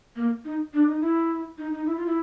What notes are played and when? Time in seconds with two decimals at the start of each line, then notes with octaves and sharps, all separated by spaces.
0.16 A#3
0.45 D#4
0.74 D4
0.87 D#4
1.01 E4
1.58 D#4
1.72 D#4
1.86 E4
1.97 F4
2.06 E4